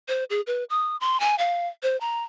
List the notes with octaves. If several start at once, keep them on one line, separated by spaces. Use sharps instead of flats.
C5
G#4
B4
D#6
C6
G#5
F5
C5
A#5